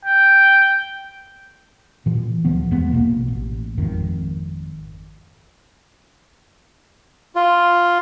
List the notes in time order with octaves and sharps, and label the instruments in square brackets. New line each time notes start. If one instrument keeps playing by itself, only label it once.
[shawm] G5
[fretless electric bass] A#2 E3
D2 E3 F3 B3
E2 G#3 B3
A#1 G2 B2 A#3
A1
G#1 F2 D#3
[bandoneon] F4